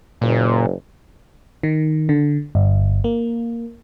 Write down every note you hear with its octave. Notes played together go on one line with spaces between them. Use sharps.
F#1 A#2
D#3
D3
G1
A#3